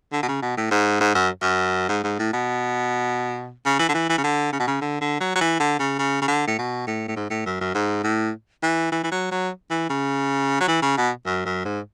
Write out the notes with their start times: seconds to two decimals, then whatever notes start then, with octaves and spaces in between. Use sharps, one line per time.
0.13 D3
0.23 B2
0.29 C#3
0.42 B2
0.57 A2
0.71 G#2
1.01 G#2
1.15 F#2
1.42 F#2
1.89 G#2
2.04 G#2
2.19 A2
2.33 B2
3.65 C#3
3.79 E3
3.89 D3
3.94 E3
4.09 E3
4.18 C#3
4.24 D3
4.53 C#3
4.60 B2
4.67 C#3
4.82 D3
5.01 D3
5.21 F#3
5.35 F#3
5.41 E3
5.60 D3
5.79 C#3
5.99 C#3
6.22 C#3
6.28 D3
6.47 A2
6.58 B2
6.87 A2
7.08 A2
7.17 G#2
7.30 A2
7.46 F#2
7.61 F#2
7.75 G#2
8.04 A2
8.63 E3
8.92 E3
9.04 E3
9.12 F#3
9.31 F#3
9.70 E3
9.90 C#3
10.61 F#3
10.68 E3
10.82 C#3
10.98 B2
11.26 F#2
11.46 F#2
11.65 G#2